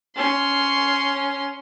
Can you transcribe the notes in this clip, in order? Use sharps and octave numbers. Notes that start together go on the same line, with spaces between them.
C#4 C6